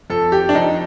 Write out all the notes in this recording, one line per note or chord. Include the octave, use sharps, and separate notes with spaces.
F2 A4
G4
D4
F2 D#4